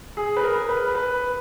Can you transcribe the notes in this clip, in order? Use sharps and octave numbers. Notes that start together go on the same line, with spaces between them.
G#4
B4
A#4
B4
B4